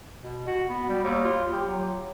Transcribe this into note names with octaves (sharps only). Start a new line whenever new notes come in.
B2
F#4
B3
G3
D#2
F4
G4
F#3